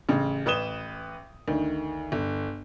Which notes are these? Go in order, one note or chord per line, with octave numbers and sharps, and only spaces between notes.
A1 C#3
A1 B4 D#6 E7 G7
D2 D#3
G1